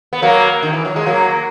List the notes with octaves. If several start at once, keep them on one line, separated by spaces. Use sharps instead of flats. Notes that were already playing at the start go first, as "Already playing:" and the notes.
B3
F#3 A#3
D#3
E3
F#3
G#3
F#3 A#3